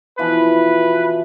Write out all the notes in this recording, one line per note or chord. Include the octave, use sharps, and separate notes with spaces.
B2 E3 F3 B4